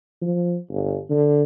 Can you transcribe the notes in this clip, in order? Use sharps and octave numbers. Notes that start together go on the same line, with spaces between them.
F3
G1
D3